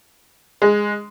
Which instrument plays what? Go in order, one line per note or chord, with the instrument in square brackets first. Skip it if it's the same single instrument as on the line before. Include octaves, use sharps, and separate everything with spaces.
[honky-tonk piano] G#3